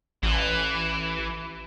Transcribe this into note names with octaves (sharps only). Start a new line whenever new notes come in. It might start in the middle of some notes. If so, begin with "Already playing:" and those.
A1 E3